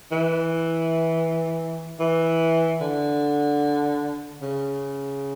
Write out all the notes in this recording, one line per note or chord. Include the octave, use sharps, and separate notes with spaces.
E3
E3
D3
C#3